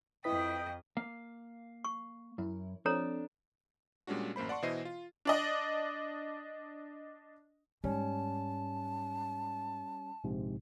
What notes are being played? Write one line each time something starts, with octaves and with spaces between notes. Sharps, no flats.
F2 E4 B4 D#5 G5 D#6 B6
A#3 F5
C#6
F#2 E4
F3 C4 D4 A4 C#5 A#5
A#2 G3 G#3 C#4 D4 F#4
A1 F#2 A#3 C5 B5
D5 F#5 A5 C6 C#6
B2 E3 E4 C5 D#5 C7
F4
D4 D5 D#5
G#2 G3 C#4 A5
A#1 G#2 C3